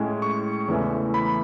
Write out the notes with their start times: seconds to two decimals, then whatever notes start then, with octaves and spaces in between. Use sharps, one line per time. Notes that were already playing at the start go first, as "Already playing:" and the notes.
Already playing: A2 G#3 C#4
0.22 C#6
0.68 E2 C#3 E3 A3 C#4
1.14 B5